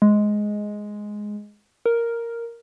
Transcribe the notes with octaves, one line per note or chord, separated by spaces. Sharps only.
G#3
A#4